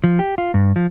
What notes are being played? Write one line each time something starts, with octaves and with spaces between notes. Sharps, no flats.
F3
G4
F4
G2
F3